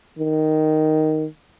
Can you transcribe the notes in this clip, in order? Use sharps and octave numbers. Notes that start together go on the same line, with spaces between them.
D#3